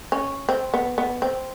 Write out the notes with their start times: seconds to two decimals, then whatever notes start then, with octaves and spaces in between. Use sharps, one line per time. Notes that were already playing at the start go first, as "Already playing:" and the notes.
0.12 C#4
0.49 C4
0.74 B3
0.98 B3
1.22 C4